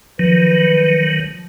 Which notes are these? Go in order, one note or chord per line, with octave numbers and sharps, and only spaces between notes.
D#3 F3 F#3 B4